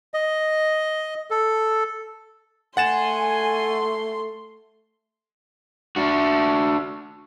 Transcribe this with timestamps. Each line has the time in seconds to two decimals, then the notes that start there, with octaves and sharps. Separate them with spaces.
0.14 D#5
1.31 A4
2.77 A3 F#5 G#5 C6 A6 E7
5.96 D4 F#4